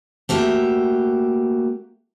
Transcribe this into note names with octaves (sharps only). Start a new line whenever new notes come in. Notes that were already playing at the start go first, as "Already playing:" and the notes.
A3 A#3 F#4 G4 E5